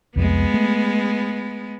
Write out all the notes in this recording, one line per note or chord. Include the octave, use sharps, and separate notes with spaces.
C2 F2 G#3 B3
A3